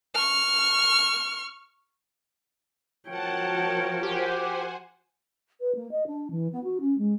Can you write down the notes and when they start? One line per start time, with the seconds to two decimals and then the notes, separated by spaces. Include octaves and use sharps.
0.14 C#6 F6
3.09 F3 F#4 A#4 C#5 F#5 G5 A5
4.03 G4 C5 F#5 G#5
5.60 B4
5.75 A#3
5.91 D#5
6.07 D4
6.30 E3
6.52 B3
6.64 F#4
6.80 C#4
6.98 G#3